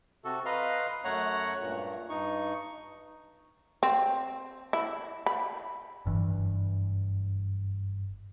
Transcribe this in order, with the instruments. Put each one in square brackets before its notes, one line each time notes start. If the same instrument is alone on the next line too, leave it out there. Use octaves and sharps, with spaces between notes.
[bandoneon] C3 F#4 A4
B4 D#5 F5 A#5 C6
F#2 A3 C#5 F#5 A#5
G2 A#2
G2 D#4 C#6
[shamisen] C4
E4
B5
[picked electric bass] F#1 G2 E3